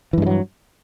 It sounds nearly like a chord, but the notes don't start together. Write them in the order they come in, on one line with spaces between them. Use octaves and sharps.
E3 G2 G#3 F#3